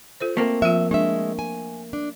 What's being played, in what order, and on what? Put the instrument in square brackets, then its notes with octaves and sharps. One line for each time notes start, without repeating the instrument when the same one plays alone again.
[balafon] F4 A4 C5
[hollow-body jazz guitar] A3 A#3 C4
[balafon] F3 F4 [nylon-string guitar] E5
[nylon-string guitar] G#3 E5 [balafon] D4
[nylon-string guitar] G#5
D4